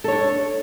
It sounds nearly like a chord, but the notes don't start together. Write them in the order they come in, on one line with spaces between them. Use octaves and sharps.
A4 C#5 D4